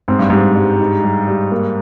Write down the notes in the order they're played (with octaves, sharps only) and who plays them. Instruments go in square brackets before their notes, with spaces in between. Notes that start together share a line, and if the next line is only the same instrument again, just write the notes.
[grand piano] G#2 [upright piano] C4
[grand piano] G2
[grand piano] G#2 [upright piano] G3
[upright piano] G3
D#4
G3
G3
A#3